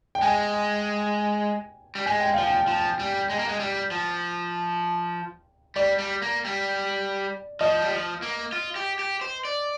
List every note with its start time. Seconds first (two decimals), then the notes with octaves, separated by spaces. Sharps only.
0.15 G5
0.22 G#3 G#5
1.95 G3
2.06 G#3 G#5
2.20 G5
2.34 F3 F5
2.47 G5
2.68 F3
2.99 G3
3.30 G#3
3.39 A#3
3.49 G#3
3.60 G3
3.91 F3
5.76 G3 D5
5.99 G3
6.22 A#3
6.45 G3
7.61 F3 D#5
7.81 G3
7.91 F3
8.22 A#3
8.53 F4
8.76 G4
8.99 G4
9.21 C5
9.45 D5